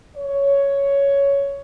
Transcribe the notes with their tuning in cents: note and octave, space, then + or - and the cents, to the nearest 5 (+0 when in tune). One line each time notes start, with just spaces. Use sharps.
C#5 +10